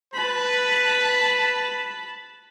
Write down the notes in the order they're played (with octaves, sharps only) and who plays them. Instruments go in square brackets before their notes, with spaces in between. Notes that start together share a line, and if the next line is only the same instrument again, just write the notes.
[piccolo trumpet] B4 [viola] A5 B5